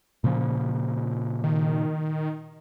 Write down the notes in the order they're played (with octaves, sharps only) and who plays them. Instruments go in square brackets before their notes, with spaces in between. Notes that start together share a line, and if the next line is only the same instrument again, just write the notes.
[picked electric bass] A#2 C#3 F3
[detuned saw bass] D#3